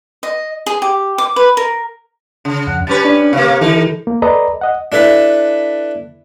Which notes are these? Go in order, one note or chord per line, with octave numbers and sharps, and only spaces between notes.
D#5
G#4
G4
D6
B4
A#4
C#3
F2 F#5
G3 C#4 B4 A5
D4
C3 A#3 F5 C#6
D#3 E3 D#4 A4
A#3
A4 B4 D5 D#5 A#5
D#5 F#5
D4 E4 A4 B4 E5